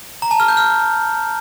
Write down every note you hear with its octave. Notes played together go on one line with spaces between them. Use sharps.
A#5
A5
F6
G6
F6